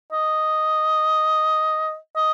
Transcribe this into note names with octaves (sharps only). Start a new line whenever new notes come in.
D#5
D#5